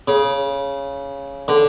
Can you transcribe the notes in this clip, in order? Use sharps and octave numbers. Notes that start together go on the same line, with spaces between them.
C#3
D3